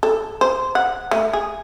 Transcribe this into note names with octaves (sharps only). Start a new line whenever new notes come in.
A4
C5
F#5
A3
G#4